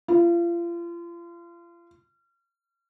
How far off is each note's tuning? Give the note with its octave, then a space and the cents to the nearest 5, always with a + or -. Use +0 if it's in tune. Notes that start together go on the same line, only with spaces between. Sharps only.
F4 -35